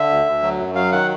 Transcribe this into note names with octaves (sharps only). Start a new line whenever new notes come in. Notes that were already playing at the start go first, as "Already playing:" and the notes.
Already playing: D3 E5
D2
D2
F#3
F#2
F#3 F5
D#3 F#5